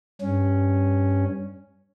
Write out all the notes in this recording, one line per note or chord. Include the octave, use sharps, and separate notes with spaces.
G2 C#4